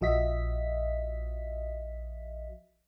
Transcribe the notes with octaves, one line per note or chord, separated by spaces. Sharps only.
A#1 F3 F#4 D#5 E5 B6